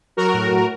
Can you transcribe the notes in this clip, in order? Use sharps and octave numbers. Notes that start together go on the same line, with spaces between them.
F#3 F#4 A#4
A2
A2